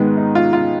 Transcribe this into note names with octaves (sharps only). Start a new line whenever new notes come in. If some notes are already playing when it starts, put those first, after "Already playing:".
Already playing: G#2 D#3 G#3 B3
D#4
F4
F4